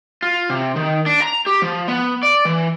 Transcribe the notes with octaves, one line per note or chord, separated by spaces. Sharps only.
F4
C3
D#3
D4
A#5
G4
F3
B3
D5
E3